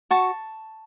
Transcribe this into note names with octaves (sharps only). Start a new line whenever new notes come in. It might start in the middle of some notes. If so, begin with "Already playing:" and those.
F#4 A5 C#6